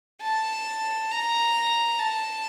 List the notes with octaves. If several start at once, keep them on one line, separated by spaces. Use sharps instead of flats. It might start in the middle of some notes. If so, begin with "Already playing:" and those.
A5
A#5
A5